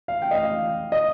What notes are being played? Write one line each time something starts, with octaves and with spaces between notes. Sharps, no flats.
F5
G5
D#5
F5
D#5